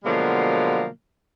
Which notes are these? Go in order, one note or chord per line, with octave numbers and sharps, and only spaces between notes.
B2 D3 F3 F#3 G#3 A#3